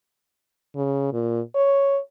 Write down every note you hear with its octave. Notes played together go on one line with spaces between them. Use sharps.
C#3
A#2
C#5